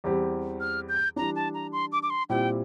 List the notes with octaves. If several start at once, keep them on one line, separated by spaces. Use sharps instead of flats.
E2 E3 G3 C4 G4
F6
G6
E3 G3 D4 A#5
A5
A#5
C6
D6
D6
C6
A#2 G3 C4 E4 G4 G5